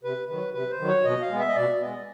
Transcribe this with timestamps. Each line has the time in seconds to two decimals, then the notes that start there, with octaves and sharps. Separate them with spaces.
0.03 C3 B4
0.28 D#3 F#3 B4
0.54 C3 B4
0.71 C5
0.79 D#3 F#3
0.88 C#5
1.05 B2 D#5
1.22 F5
1.31 G#3 B3
1.39 E5
1.48 D#5
1.55 B2 D5
1.80 G#3 B3 D#5